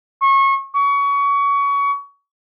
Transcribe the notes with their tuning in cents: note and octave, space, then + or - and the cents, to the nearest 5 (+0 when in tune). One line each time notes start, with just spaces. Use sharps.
C#6 -30
C#6 +25